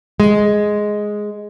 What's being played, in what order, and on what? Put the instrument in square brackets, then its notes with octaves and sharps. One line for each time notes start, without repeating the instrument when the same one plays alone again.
[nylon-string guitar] G#3